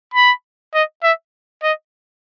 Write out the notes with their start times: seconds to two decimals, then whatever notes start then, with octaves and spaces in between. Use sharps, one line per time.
0.14 B5
0.74 D#5
1.03 E5
1.63 D#5